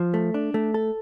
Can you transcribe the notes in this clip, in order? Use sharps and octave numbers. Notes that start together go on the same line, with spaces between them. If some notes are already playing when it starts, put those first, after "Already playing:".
Already playing: F3
A3
D4
A3
A4